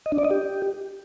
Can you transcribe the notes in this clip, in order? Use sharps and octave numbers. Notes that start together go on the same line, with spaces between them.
D#5
D4
D5
D#5
G4